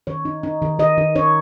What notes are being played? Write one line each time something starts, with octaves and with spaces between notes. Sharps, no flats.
D#3 C#5
D#4
D#4
D#3
D#3 D#5
D#3
D#4 C#5